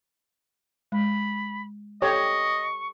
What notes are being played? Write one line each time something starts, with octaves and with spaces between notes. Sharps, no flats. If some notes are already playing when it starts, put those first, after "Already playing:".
G#3 B5
G4 A4 C#5 D#5 C#6